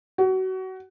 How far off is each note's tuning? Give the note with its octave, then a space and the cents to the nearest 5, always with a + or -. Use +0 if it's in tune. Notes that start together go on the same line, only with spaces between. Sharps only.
F#4 +25